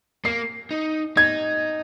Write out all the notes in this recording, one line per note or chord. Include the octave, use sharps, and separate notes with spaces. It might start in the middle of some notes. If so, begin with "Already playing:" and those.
A#3 C7
D#4
D#4 G#6